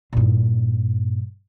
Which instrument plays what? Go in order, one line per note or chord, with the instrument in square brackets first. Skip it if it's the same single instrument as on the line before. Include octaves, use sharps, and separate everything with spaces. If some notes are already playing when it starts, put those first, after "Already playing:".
[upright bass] G2 A#2